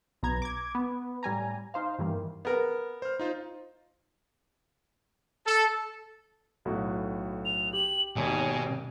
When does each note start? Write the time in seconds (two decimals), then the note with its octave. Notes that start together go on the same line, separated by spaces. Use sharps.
0.23 B1 B3 A#5 G#6
0.42 D6 G#6
0.75 B3
1.23 A2 G3 G#5 A#5
1.74 D#4 C5 F5
1.99 G2 D#3 E3 G3 A#3
2.45 B3 A#4
3.02 C5 F6
3.19 D#4 F4 C5
5.45 A4
6.65 B1 A2 F#4
7.45 F7
7.73 G4 F#7
8.16 G#1 D#2 B2 C#5 G#5